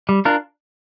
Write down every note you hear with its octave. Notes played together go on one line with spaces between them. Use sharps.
G3
D4 F4 A#4